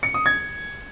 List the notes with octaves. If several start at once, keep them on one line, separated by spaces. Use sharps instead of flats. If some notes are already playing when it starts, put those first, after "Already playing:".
C#7
D#6
G#6